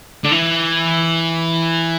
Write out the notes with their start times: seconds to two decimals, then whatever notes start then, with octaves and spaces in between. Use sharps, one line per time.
0.24 D3
0.31 E3